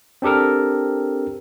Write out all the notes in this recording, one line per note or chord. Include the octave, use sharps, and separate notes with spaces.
C4 D4 G4 A4 A#4